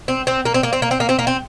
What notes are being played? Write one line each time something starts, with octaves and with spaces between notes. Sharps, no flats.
C4
C4
A#3
C4
A#3
C4
A#3
C4
A#3
C4
A#3
C4